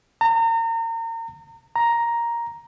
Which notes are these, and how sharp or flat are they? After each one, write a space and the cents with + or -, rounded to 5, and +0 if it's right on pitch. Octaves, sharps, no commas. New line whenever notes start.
A#5 -35
A#5 +5